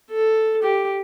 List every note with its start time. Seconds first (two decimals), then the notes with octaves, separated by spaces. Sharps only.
0.10 A4
0.62 G4